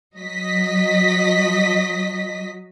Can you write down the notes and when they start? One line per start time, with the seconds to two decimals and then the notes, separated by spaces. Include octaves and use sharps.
0.17 F#3 D#5 B6